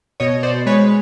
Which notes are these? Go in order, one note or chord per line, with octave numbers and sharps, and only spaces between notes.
B2 C#5 D#5
C5 D5
G#3 B4 C#5